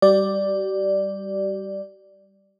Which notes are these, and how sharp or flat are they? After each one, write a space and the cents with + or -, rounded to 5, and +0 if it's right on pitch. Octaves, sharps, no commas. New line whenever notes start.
G3 +0 G4 -45 D5 +0